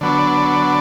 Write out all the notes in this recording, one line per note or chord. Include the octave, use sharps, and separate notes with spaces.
D3 F#3 B3 D4